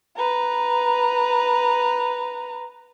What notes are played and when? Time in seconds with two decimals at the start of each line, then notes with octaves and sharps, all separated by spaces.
0.17 B4 A#5